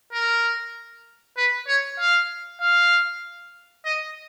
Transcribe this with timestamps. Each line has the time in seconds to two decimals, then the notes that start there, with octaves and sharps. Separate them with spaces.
0.13 A#4
1.37 B4
1.67 C#5
1.99 F5
2.61 F5
3.85 D#5